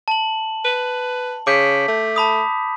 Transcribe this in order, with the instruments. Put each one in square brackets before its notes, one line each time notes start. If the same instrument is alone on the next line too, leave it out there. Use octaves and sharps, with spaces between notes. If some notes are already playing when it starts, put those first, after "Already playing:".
[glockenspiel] A5 F#7
[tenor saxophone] B4
[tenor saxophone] C#3 [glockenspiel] D6 G6 B6
[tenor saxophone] A3
[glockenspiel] A5 B5 D#6